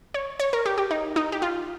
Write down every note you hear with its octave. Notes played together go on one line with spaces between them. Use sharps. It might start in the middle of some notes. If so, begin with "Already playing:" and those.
C#5
C#5
A#4
G4
G4
D#4
D#4
G4
F4